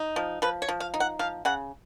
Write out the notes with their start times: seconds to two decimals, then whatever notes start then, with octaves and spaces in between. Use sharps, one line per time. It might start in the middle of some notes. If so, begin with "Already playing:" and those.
Already playing: D#4
0.16 F3
0.42 F3 B4
0.62 C#5
0.68 F3
0.80 F5
0.94 D#4
1.00 F#5
1.19 F3 F5
1.45 C#3 F#5